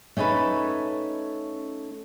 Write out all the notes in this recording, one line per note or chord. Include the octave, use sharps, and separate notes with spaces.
A3 C#4 D#4 A4 B4